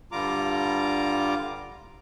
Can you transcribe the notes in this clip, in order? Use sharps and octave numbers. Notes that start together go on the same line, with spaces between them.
G2 D3 G3 F4 A#5 D6